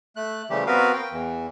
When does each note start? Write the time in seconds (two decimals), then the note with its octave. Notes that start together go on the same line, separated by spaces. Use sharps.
0.16 A3 F#6
0.50 C#3 E3 F3 G3 A3 G4
0.66 B3 C4 F#4 A#4 B4 F5
0.94 G5
1.12 E2 E3